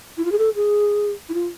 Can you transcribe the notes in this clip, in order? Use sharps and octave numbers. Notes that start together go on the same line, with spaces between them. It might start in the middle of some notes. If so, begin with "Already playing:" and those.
E4
F4
G#4
A4
G#4
E4
F4